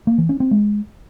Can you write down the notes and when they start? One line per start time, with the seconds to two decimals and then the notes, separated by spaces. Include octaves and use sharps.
0.07 A#3
0.18 E3
0.29 C#4
0.40 C4
0.51 G#3